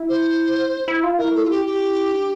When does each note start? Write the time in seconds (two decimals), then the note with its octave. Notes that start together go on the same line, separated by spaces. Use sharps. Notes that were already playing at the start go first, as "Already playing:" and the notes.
Already playing: E4
0.09 C5
0.88 E4
1.03 F4
1.18 E4 A#4
1.35 A4
1.45 F4
1.50 G4
1.66 G4
2.12 D4